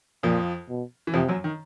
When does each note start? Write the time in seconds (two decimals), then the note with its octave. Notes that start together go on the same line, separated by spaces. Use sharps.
0.23 F2 A#2 F3
0.69 B2
1.07 E3
1.14 F2 C3 F3
1.28 F#2 F#3
1.44 D#3